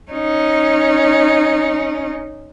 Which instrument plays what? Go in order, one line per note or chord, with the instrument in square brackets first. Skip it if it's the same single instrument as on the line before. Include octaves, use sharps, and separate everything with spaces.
[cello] C#4 D#4